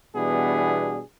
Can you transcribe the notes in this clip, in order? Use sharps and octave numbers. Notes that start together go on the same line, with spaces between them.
B2 E3 G3 B3 D4 G#4